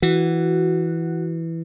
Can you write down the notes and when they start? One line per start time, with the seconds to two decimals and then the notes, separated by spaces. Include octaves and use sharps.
0.02 E3 F#4